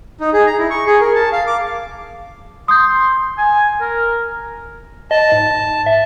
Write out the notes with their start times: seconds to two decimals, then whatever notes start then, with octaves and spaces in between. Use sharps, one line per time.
0.20 D#4
0.33 G#4
0.46 A#5
0.58 E4
0.70 C#6
0.87 G#4
1.01 A#4
1.15 A5
1.32 F5
1.47 D6
2.68 C6 D#6 G6
3.38 G#5
3.81 A#4
5.11 D#5 A5
5.32 G#2
5.86 E5